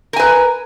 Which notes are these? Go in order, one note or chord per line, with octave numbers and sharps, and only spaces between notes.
A#4 B4 G#5